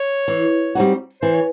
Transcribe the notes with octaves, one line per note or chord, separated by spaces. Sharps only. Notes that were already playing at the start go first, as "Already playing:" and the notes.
Already playing: C#5
E3
G3 C4 D#4 F#4
E3 C5
C#5